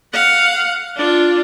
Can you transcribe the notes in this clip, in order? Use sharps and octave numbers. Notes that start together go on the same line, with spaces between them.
F5 F#5
D4 F4